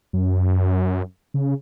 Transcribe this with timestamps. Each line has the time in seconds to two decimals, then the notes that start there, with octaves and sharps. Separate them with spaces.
0.13 F#2
1.34 C#3